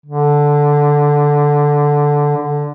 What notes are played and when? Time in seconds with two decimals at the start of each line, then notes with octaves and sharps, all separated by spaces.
0.06 D3
2.37 D3